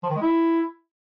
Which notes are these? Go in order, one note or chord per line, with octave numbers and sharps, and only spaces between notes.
F3
D#3
G#3
E4